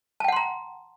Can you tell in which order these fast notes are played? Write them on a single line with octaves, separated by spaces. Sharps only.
A5 G5 F#5 C6 A#5